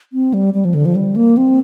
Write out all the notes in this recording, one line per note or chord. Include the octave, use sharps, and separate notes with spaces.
C4
G3
G3
F3
D3
F3
G3
A#3
C4